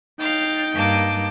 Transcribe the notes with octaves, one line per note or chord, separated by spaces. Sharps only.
D#4 F5 G5 A6
G2 A#3 A5 D6